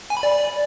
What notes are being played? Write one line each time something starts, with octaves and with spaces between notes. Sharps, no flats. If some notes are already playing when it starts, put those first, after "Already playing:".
G#5
B5
D5